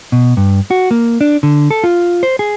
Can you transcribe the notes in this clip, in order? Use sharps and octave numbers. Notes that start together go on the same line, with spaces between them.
B2
G2
F#4
A#3
D4
D3
A4
F4
C5
G#4